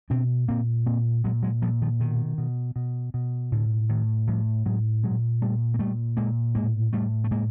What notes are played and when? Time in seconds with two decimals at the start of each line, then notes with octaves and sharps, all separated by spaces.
0.10 B2 C4 D4
0.48 A#2 A#3 C4
0.86 A#2 A#3 C4
1.24 A#2 F#3 G#3
1.43 F#3 G#3
1.62 A#2 F3 G3
1.82 D#3 F3
2.00 B2 D#3
2.38 B2
2.76 B2
3.14 B2
3.52 A2 D3
3.89 A2 D#3
4.27 A2 F3 G3
4.66 A2 F#3 G#3
5.03 A#2 F#3 G#3
5.41 A#2 G3 A3
5.74 A#3
5.79 A#2 G3 A3
6.17 A#2 G#3 A#3
6.55 A2 G#3 A#3
6.93 A2 G3 A3
7.24 A3
7.31 A2 G#3 A#3